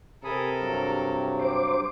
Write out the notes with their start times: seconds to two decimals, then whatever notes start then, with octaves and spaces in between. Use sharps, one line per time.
0.24 C3 A4 A#4 G#5 B5 D#6
0.60 G2 F#3
1.39 C5 D6